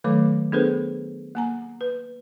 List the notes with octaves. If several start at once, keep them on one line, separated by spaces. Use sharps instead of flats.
D#3 F#3 A3 A4 C#5 D6
B3 D4 G#4 A4 B4 C5
A#3 G#5 A#5
B4